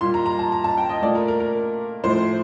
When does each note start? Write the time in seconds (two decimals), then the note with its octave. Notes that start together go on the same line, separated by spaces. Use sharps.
0.01 A#2 G3 C6
0.14 A#5
0.26 A#5
0.39 A5
0.52 A#5
0.64 A5
0.77 G5
0.89 D#5
1.02 A#2 A3 D5
1.15 A#4
1.28 A#4
1.40 A#4
2.03 A2 F3 A3 C5